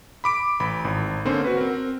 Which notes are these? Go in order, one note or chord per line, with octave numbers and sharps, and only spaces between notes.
B5 D6 D7
A1 B5
G#1
D3 A#3 C4 C#4 C5
F#4 B4
C4 A#4